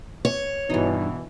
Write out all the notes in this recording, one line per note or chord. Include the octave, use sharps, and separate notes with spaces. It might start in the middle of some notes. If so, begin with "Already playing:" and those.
C#5
G2 B2 E3 D#4